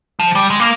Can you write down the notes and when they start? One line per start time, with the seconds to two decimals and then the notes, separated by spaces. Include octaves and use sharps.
0.20 F3
0.35 G3
0.50 G#3
0.60 A#3